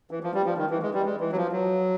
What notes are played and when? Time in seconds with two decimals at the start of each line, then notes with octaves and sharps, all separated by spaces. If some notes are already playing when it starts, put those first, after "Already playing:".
0.11 E3
0.23 F3
0.34 G3
0.46 F3
0.57 D#3
0.70 E3
0.82 G#3
0.94 G3
1.05 G#3
1.20 E3
1.32 F#3
1.36 F3
1.52 F#3